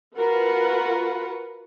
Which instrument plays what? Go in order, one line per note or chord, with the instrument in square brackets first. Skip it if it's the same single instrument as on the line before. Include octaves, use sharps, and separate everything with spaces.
[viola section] F4 F#4 A#4 B4 F#5